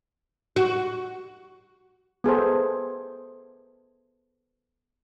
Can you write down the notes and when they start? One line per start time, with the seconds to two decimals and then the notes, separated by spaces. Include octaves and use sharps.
0.56 F#4
2.24 B3 G#4 A4 C5